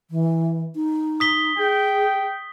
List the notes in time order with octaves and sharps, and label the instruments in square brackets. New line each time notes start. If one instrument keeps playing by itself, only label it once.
[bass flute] E3
D#4
[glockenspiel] D#6 B6 G7
[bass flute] G#4 [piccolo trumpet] G5